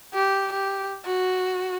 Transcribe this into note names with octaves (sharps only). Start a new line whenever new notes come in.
G4
G4
F#4